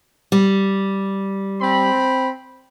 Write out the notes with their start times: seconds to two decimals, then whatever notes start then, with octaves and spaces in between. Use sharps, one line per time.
0.32 G3
1.62 C4 B5